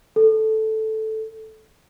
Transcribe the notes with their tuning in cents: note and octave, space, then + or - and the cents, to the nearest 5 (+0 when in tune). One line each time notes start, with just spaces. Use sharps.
A4 -5